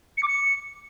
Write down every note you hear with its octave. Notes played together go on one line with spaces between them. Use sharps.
C#7
D6
C#7